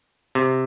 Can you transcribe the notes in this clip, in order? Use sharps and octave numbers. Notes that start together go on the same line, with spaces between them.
C3